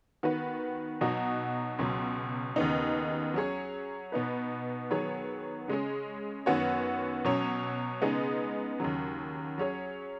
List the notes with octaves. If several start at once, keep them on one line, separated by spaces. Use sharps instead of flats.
D#3 B3 F#4 B4
B2 F#3 D#4 F#4
C#2 B2 F#3
D#2 C#3 B3 D#4
F#3 C#4 G#4 C#5
B2 B3 D#4 B4
D#3 F#3 B3 G#4 C#5
C#3 G#3 C#4 G#4
F#2 D#3 B3 F#4 C#5
B2 F#3 C#4
C#3 G#3 B3 D#4 G#4
D#2 C#3 F#3
F#3 C#4 G#4 C#5